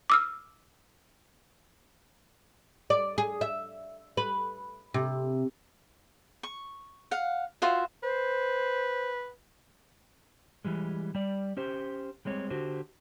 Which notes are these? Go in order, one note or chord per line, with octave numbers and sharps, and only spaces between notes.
D6 E6 F6
D5
G#4
E5
B4
C3
C#6
F5 F#5
F4 F#4 C5 E5
B4 C5
E3 G3 G#3
G3 D5
C#4 G4 C5
G3 G#3 C4 C#5
D3 F#4 G4 C5